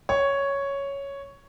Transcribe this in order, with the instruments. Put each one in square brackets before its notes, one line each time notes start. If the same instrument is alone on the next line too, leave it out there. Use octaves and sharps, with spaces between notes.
[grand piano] C#5